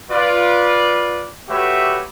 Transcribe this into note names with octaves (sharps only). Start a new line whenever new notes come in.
F4 B4 D5
A3 F#4 G4 B4 C#5 E5